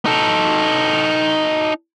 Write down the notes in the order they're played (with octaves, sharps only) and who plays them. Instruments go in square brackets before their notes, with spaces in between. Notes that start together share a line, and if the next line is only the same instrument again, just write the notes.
[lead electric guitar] D#4 A4